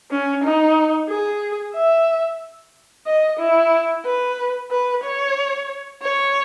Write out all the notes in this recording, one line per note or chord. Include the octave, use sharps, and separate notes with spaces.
C#4
D#4
G#4
E5
D#5
E4
B4
B4
C#5
C#5